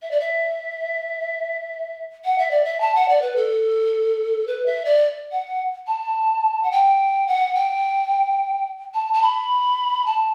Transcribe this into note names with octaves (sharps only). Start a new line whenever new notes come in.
E5
D5
E5
F#5
E5
D5
E5
A5
F#5
D5
B4
A4
B4
E5
D5
F#5
A5
F#5
G5
F#5
G5
A5
A5
B5
A5